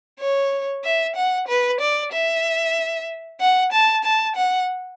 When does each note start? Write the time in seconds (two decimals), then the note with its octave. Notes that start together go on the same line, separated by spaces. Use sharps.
0.20 C#5
0.84 E5
1.16 F#5
1.48 B4
1.81 D5
2.13 E5
3.41 F#5
3.73 A5
4.04 A5
4.37 F#5